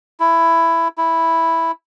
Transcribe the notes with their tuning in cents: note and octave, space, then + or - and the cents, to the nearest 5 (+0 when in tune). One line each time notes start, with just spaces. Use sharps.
E4 +10
E4 -5